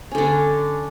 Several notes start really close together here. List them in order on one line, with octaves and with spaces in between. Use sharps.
C#4 D3 D4